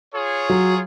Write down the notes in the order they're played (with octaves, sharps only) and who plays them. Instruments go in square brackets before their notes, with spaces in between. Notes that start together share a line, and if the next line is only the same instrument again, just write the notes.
[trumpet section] F4 G#4 C#5
[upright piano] F#3